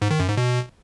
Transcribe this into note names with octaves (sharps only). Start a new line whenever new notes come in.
G#2
D#3
F#2
G#2
B2